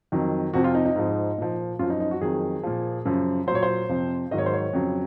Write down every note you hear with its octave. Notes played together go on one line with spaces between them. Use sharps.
F2 D#3 F#3
F2 C3 F3 F#4
F4
D#4
D#4
G#2 F3
A#2 F3
F#2 F3 F4
D#4
D#4
F#4
F2 D#3 F#3 G#4
A#2 F3
F#2 C#3 F3
A#2 F#3 C5 C#5
C5
F2 C3 F3
G#2 D#3 F#3 D#5
C#5
C5
C#5
F2 C#3 F#3